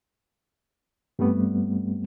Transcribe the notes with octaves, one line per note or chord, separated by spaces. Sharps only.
G2 G3 A3 B3 C4